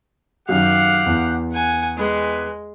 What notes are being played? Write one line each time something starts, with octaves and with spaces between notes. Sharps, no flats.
F#2 D#3 G4 F5 F#5
E2
F#5 G#5
G#3 G4 G#4 B4